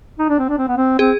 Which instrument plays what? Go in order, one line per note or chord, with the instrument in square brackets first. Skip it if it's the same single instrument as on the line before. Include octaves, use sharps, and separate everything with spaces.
[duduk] D#4
D4
C4
D4
C4
B3
C4
[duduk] C4 [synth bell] G#4